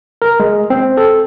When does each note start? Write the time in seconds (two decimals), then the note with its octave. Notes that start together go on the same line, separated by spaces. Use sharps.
0.22 A#4
0.40 G#3
0.70 C4
0.97 A4